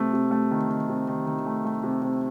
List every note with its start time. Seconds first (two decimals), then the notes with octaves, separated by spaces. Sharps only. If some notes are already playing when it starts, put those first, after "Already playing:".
Already playing: C3 A3
0.13 C3
0.31 A3
0.51 D#3
0.70 D#3
0.89 C3
1.08 D#3
1.26 D#3
1.46 A3
1.65 A3
1.83 C3
2.02 C3